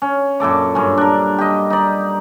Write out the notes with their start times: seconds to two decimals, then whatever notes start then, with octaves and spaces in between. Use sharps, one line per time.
0.02 C#4
0.40 F#2 A#2 A4 D6
0.75 G2 C#4
0.98 D4 A#4
1.38 G4 D#5
1.70 D#4 D5